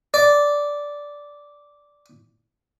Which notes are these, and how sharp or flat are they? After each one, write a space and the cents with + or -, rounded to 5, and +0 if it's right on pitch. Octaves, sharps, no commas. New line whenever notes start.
D5 -10